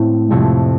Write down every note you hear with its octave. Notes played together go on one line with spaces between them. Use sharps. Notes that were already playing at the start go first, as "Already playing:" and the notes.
Already playing: A2 A3 C4
F2 C3 A3